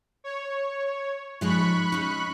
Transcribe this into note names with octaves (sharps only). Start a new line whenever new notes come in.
C#5
F3 G#3 D#4 B5 C#6 F#6
C#4 D#4